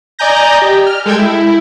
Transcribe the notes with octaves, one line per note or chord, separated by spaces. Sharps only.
D5 D#5 G#5 A#5 G6 A#6
G4
F6
G#3 A4 G5 G#6
E4